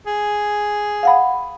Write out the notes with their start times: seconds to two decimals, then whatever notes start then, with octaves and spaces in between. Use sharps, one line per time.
0.06 G#4
1.03 F5 F#5 B5